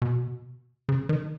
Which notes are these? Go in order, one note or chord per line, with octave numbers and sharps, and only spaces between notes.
B2
C#3
D#3